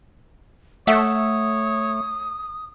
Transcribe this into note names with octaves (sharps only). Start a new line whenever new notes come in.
A3 A4 C#5 E5 F#5 D#6